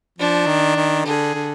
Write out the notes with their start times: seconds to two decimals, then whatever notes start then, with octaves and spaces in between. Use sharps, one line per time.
0.19 F3 D4
0.47 D#3
0.76 D#3
1.05 D3 G#4
1.35 D3